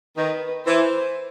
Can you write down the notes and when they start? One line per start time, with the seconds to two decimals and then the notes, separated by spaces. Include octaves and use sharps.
0.16 D#3 B4
0.65 E3 C5